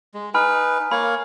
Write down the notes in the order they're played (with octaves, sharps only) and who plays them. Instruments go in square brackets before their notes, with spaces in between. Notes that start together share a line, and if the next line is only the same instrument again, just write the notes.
[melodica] G#3
[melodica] D#4 B4 [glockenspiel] G#5 B5 F6
[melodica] A#3 C#5 F5 [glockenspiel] B5